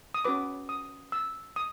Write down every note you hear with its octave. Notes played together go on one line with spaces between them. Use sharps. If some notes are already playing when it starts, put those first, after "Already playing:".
D#6
C#4 F#4 B4 D6
D#6
E6
D#6